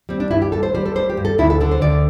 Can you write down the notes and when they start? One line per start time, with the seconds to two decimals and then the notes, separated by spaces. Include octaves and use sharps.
0.09 G3 C4
0.20 D4
0.31 G2 E4
0.42 G4
0.52 G2 A4
0.63 C5
0.75 G3 C5
0.86 A4
0.95 G3 C5
1.10 G4
1.17 G2
1.25 A4
1.38 D2 E4
1.50 A4
1.60 D3 A4
1.71 C5
1.82 D2 D5